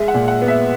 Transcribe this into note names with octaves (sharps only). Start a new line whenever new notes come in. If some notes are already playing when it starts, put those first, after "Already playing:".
Already playing: G#3 E5
F#5
A#2
F#5
B3
E5